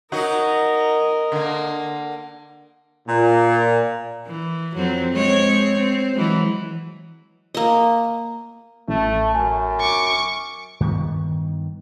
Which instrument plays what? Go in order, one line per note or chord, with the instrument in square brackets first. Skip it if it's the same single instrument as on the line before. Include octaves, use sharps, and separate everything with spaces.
[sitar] F#3 D#4 F#4 [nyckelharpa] A#4 D#5
[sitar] D3 A#3
[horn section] A#2
[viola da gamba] E3
F2 F#3 C4
G#3 C4 C#5
C4
E3 F#3 G#3
[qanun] A#3 D#5
[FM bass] A1 [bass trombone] A3
[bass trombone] F#2 [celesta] G#5
[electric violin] C#6 D6
[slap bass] G2 D#3 B3